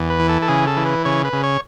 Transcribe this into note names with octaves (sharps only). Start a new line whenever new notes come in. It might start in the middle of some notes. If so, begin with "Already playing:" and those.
Already playing: E2
B4
E3
A4
A4
C#3 G#4
A4
E3
B4
C#3 C#5
B4
C#3
C#5